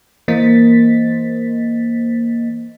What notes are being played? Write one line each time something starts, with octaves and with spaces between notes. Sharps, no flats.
E3 A#3 C5 D#5 A6 B6